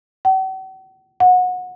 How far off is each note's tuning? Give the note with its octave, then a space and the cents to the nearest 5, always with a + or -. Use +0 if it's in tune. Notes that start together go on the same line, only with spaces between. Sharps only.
F#5 +45
F#5 -25